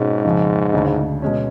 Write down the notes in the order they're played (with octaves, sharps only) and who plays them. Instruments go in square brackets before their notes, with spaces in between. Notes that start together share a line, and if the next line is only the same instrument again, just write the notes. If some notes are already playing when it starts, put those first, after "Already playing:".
Already playing: [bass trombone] G#2 [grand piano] B2 G#3 C#4
[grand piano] F2 C#3 F3
D2 C#3 G#3 D4
B2 G#3 C#4